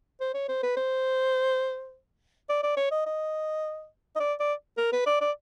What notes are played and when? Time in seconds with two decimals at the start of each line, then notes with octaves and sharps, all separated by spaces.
0.21 C5
0.34 C#5
0.48 C5
0.63 B4
0.77 C5
2.49 D5
2.63 D5
2.77 C#5
2.91 D#5
3.06 D#5
4.16 D#5
4.20 D5
4.40 D5
4.78 A#4
4.93 B4
5.07 D5
5.21 D5